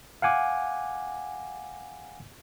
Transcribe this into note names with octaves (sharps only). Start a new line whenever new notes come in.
F5 F#5 G#5 D6